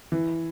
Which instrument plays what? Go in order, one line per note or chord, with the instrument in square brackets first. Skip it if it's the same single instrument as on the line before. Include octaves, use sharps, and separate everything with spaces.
[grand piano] E3